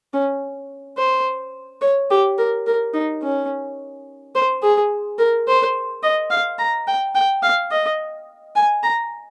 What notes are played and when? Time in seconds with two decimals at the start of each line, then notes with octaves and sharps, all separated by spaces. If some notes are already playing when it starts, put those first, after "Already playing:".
0.13 C#4
0.97 C5
1.81 C#5
2.11 G4
2.38 A#4
2.67 A#4
2.94 D#4
3.22 C#4
4.35 C5
4.63 G#4
5.19 A#4
5.47 C5
6.03 D#5
6.30 F5
6.59 A#5
6.88 G5
7.15 G5
7.43 F5
7.71 D#5
8.56 G#5
8.83 A#5